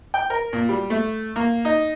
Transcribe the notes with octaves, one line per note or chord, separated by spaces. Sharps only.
G5
A#4
A#2
G3
A3
A#3
D#4